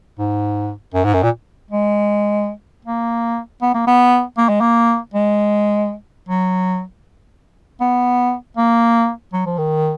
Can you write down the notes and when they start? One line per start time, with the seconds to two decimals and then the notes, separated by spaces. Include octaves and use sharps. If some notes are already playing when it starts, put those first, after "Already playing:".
0.19 G#2
0.94 F#2
1.04 G#2
1.14 F#2
1.23 A#2
1.71 G#3
2.85 A#3
3.62 B3
3.74 A#3
3.87 B3
4.38 A#3
4.49 G#3
4.61 A#3
5.14 G#3
6.29 F#3
7.81 B3
8.57 A#3
9.33 F#3
9.46 F3
9.58 D#3